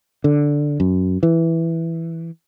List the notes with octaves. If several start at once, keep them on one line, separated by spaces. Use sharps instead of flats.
D3
F#2
E3